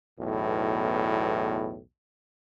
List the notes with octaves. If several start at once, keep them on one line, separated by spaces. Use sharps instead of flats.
B1 E2 A2